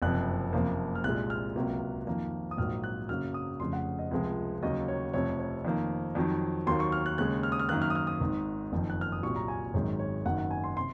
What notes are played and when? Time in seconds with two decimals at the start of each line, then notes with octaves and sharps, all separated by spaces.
0.02 F#1 F2 C3 F#6
0.53 F#1 F2 C3 F3 A#3
0.95 F6
1.04 C2 A#2 G#3 F#6
1.30 F6
1.56 C#2 C3 F#3 A#3
2.07 F2 D#3 A#3
2.51 D#6
2.57 A#1 G#2 F#3 A#3 F6
2.84 F#6
3.09 F#2 C#3 F#3 A#3 F6
3.34 D#6
3.60 F1 F2 C#3 C6
3.73 F#5
3.99 D#5
4.11 C#2 C3 F3 G#3
4.62 D#2 C#3 F#3 A#3 D#5
4.88 C#5
5.13 F1 F2 C3 C#5
5.40 C#5
5.65 F2 D#3 A#3
6.15 F2 D#3 F#3
6.67 D#2 D#3 F#3 A#3 C6
6.80 C#6
6.92 F6
7.06 F#6
7.18 D#2 C#3 G#3 F#6
7.43 F6
7.52 D#6
7.59 F6
7.69 F#2 D#3 A#3 F#6
7.82 F6
7.90 D#6
7.95 F6
8.07 D#6
8.20 G#1 G#2 D#3
8.72 F#1 F2 D#3
8.90 F#6
9.01 F6
9.12 D#6
9.23 C2 A#2 F#3 C#6
9.36 A#5
9.48 G#5
9.74 G#1 F#2 D#3 G#3 C#5
9.99 C#5
10.25 F#1 F#2 D#3 F#5
10.38 F#5
10.51 G#5
10.64 C6
10.77 C3 C6